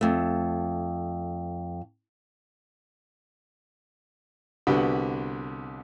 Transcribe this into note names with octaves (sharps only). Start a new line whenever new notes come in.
F2 A3
C2 D3 B3 F#4 G4 B5